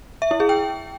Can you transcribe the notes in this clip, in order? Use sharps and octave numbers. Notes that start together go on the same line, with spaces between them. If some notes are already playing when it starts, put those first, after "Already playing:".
E5
E4
G#4
G5